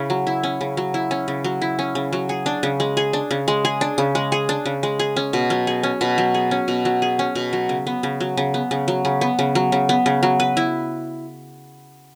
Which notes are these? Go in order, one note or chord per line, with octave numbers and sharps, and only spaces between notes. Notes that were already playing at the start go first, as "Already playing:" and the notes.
Already playing: C#3 C#4 E4
F#3
E4
C#4
C#3
F#3
E4
C#4
C#3
F#3
E4
C#4
C#3
F#3
G#4
D4
C#3
G#3
G#4
D4
C#3
G#3
G#4
D4
C#3
G#3
G#4
D4
C#3
G#3
G#4
C#4
B2
F#3
G#4
C#4
B2
F#3
G#4
C#4
B2
F#3
G#4
C#4
B2
F#3
C#3
B3
C#3
F#3
C#3
B3
C#3
F#3
C#3
B3
C#3
F#3
C#3
B3
C#3
F#3
B4
E4